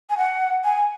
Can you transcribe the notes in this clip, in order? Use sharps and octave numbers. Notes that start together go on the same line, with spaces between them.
G#5
F#5
G#5